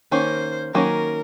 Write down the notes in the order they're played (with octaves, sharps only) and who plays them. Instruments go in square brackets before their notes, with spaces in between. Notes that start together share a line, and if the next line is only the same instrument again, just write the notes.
[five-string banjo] D#3 A#3 C#4 [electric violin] C5
[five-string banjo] D#3 F#3 A#3 C#4 [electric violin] A#4